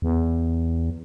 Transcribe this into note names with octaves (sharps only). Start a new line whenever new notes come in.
E2